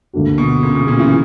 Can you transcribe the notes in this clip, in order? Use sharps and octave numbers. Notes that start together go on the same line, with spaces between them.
D2 D3 A#3 D4 F#4
B2
A#2 C#3
B2
A#2 C#3
C#3 E3